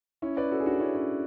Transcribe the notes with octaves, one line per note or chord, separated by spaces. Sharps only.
C#4 E4
B4 D5
F#4 A4
G#4
D4 F#4
C#4 E4
C#4